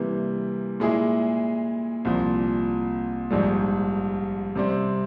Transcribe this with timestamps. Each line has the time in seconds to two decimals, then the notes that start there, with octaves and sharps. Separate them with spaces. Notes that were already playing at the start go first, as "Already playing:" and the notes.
Already playing: C3 E3 G3 A#3
0.80 A#2 G#3 E4 G#4
2.05 C2 A#2 F3
3.30 A#1 G#2 G3
4.55 C3 G3 C4